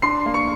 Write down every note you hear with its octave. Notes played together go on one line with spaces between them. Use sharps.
D4 C6 C7
A#3
C#6 C#7